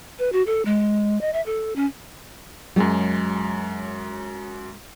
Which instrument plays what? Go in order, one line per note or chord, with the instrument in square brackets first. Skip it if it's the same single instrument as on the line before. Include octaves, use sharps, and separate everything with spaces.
[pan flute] B4
F#4
A4
G#3
D#5
E5
A4
C#4
[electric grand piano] F#2 F#3 [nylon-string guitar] G#3 G#4